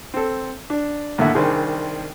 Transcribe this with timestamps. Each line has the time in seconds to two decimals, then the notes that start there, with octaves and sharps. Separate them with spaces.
0.14 C4 A4
0.70 D4
1.18 D#2 A2 D3 A3 E5 F#5
1.35 C2 D#3 C4 D4 G#4